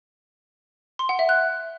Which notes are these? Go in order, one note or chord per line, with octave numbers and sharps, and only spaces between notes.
C6
F#5
E5
F#6